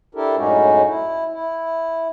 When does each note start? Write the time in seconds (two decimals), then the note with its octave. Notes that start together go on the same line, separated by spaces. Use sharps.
0.15 D4 E4 G4 A4 A#4
0.37 F#2 A2 G#3 C#4 D#4 F#4
0.86 E4
1.30 E4